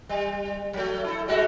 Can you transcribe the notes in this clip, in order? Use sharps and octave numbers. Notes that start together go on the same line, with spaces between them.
G3
F#3 A3
E4 A4
G3 G#3 F#4